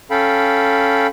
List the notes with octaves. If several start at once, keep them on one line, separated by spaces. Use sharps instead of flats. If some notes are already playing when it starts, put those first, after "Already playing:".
C#4 A4 F5 G5 B5